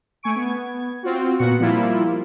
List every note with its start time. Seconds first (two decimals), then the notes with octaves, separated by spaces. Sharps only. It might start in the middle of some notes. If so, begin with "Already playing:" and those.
0.23 A3 G#5 C#6 D7
0.36 B3 G#6
1.03 C4 F4 F#4
1.39 A#2 B3 F#4 F#5 C#7
1.60 F3 G3 A#3 E4 F4